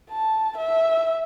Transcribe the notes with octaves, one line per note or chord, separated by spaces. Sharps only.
A5
E5